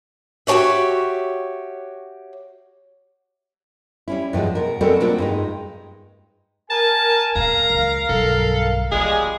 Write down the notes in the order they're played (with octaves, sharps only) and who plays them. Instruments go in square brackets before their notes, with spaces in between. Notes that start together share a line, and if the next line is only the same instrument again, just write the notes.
[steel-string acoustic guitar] F#4 G4 A4 C#5 E5
[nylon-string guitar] G3 C#4 E4
G2 B2 F3 G#3
B2 A#4
G3 G#3 C4 F#4 A4 A#4
B2 A#3 C4 D4 F4 F#4
G2 G#3 D#4
[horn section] A#4 G#5 [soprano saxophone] A5
[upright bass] E2 A#2 [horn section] A#4 F5 [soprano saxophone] A#5
[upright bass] C#2
[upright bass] B1 G2 [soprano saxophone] A4
[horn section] F3 G3 G#3 [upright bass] B3 [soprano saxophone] G#4